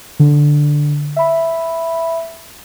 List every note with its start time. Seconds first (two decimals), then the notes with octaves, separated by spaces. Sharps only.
0.20 D3
1.16 E5 B5